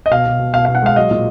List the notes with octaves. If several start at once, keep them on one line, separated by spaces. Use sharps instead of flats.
D#5
B2 F5
B2
B2
B2 F5
F5
B2
F#5
G#3 F5
F#3 D#5
A#2